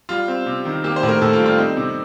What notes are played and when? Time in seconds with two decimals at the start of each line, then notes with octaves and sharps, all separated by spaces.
0.09 G3 F4
0.28 C4
0.46 C3
0.65 D#3
0.84 A#3 G4
0.96 C5
1.03 A2
1.09 A#4
1.22 A2 A4
1.33 F4
1.40 G3
1.46 F4
1.58 C4 D#4
1.77 C3